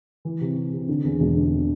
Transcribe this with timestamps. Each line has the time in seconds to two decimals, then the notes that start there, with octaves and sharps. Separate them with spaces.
0.25 E3
0.41 C3
0.57 C3
0.73 C3
0.89 D3
1.04 E2
1.20 E1
1.36 D3